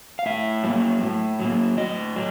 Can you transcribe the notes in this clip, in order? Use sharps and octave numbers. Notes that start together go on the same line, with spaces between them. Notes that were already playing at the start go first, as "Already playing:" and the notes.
F5
A2 E5
F#3 A#3
A2
F#3
A#3
A2 D#5
F#3